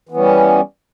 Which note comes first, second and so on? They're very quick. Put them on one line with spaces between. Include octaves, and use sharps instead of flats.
E3 B3 C#4 G3